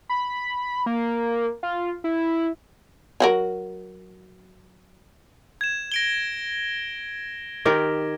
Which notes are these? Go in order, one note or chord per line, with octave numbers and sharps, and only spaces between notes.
B5
A#3
F4
E4
F#3 F#4 A#4
G#6 E7
A#6 D7 G7
D#3 G4 A#4